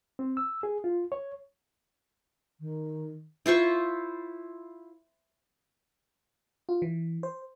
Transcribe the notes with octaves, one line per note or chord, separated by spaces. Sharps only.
C4
E6
G#4
F4
C#5
D#3
E4 F4 C5 C#6
F4
E3
C5